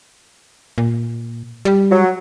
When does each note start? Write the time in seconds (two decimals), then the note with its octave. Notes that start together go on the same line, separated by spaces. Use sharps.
0.78 A#2
1.65 G3
1.91 F#3